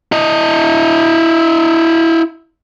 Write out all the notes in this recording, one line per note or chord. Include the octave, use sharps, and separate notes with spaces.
E4 D#5